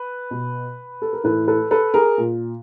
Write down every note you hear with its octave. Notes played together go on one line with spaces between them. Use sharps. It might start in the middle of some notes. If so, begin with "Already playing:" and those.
Already playing: B4
B2
A4
A#4
A2 E3 A4 B4
A4 B4
A4 B4
G#4 A#4
A#2